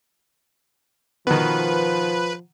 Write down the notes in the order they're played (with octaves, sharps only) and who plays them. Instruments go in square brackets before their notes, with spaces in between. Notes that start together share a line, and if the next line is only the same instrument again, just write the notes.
[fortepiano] B2 D#3 [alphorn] F3 [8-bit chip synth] B4